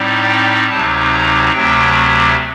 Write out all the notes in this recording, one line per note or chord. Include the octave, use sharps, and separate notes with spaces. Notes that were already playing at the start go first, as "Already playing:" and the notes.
Already playing: A2 G3 C4 D#4
G5
D2 C3 F#3 C4 D#4 A5
A#5
D2 C3 F#3 A3 C4 G5